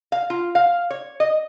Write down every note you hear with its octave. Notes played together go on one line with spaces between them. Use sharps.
F5
F4
F5
C#5
D#5